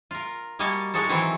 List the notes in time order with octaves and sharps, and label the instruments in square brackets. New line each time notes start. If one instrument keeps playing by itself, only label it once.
[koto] F4 A#4
G3 A#3 F#4 D#5 G#5 A5
A2 G#3 D#4 F#4 A4
D#3 E3 F#3 C4 E4